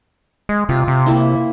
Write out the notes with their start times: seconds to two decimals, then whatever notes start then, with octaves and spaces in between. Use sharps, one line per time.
0.49 G#3
0.69 C3 F4
0.88 C3
1.06 A#3 E4